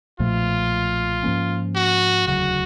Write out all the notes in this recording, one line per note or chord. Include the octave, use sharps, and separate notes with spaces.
B1 A#2 F3 A3 F4
G#2 F3 A#3 C#4
F#4
E1 D2 C#3 F#3 F#4